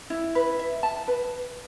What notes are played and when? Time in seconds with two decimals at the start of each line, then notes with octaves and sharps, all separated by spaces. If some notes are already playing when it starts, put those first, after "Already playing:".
0.10 E4
0.35 B4
0.59 E5
0.83 A5
1.08 B4